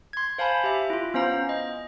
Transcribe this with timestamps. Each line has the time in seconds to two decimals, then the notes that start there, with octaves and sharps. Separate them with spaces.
0.13 C6 G#6
0.38 C5 F5 G#5 A5 B5
0.64 G4 E5
0.90 E4 F4
1.14 B3 C#4 C5 F5 A#5
1.49 D#5